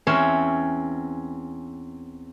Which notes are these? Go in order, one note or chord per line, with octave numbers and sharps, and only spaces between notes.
E2 C4 C#4 C#5 E5 C6